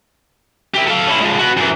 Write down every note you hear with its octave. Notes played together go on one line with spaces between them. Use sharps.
E4 G4
A4 F5
C#4 E4
F3 G#3
B3 F#4
F#2 E3